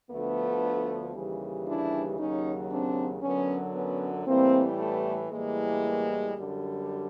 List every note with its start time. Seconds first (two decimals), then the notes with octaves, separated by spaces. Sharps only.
0.11 D2 D3 F3 A3 B3
1.14 D#2 C#3 E3 G3
1.67 D4 E4
2.18 D#2 C#3 F#3 C#4 D#4
2.71 C4 D4
3.22 F#2 D3 F#3 B3 C#4
3.74 B3 C#4
4.26 A2 E3 G3 A#3 C4
4.78 A3 B3
5.30 A2 E3 G3 G#3 A#3
6.34 F#2 D3 G3